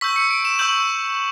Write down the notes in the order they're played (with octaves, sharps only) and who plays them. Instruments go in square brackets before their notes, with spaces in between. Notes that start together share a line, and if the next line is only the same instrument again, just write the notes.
[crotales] C#6 E6 G6 B6
C#7
D7
E7
C#6 E6 G6 F#7